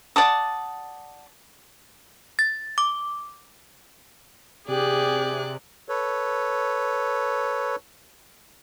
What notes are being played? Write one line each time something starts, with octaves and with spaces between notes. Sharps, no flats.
D5 F#5 A5 D#6
A6
D6
C3 G4 G#4 D5 F#6
A4 B4 C#5